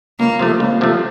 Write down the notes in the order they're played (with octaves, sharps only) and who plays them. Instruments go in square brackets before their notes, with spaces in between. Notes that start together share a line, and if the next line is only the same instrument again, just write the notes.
[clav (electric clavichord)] C#2 [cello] A#3
[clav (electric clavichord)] C3 F3 A3
C#2
C3 F3 A3